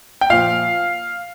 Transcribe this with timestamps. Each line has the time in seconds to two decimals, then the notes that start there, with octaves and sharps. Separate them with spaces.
0.21 G5
0.30 A#2 F3 F5